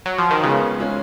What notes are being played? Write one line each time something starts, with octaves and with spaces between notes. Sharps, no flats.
F#3
F3
D#3
C#3 G#3 B3 F4 G#4
F3 G#3 C#4